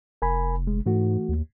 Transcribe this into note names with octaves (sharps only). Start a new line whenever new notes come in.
F1 A#4 G#5 B5
G#3
G#2 E3 A3 F#4
D#2